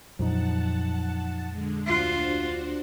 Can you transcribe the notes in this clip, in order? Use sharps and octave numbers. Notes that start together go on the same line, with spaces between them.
F2 A#2 F3 F#3 D#4 F#5 A5
D3 G#3
D2 D4 F4 F#4 C5 F#6